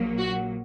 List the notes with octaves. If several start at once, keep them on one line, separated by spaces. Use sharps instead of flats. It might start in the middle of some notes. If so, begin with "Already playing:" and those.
Already playing: A#1 A#2 F#3 A#3
F#4